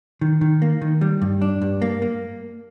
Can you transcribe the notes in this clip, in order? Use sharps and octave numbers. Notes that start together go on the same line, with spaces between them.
D#3
D#3
A#3
D#3
G3
G2
D4
G2
A#3
A#3